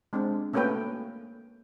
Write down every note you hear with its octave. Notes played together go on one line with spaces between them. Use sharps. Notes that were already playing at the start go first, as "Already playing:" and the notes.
G#3 C4 D4
A3 A#3 C#4 F#4 B4 G5